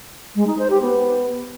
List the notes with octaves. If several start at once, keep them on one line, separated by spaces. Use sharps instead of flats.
G#3
D#4
C5
G4
B3